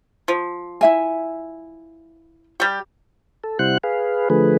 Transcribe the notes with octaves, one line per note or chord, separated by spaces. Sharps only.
F3
E4 E5 G#5
G3 G4
A4
C3 G3 E4 C5 F#5 F#6
G#4 B4 F5
D3 F3 A3 G#4 B4